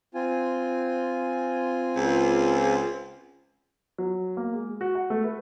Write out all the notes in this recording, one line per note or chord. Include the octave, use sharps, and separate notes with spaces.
C4 F4 G#5
C#2
F#3
A#3
G#3
F#4
F#5
A3
B4